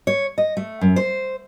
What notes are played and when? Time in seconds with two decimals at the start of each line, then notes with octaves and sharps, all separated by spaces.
0.07 C#5
0.38 D#5
0.57 A3
0.81 F#2
0.96 C5